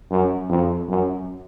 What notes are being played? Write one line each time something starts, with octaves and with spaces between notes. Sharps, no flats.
F#2
F2
F#2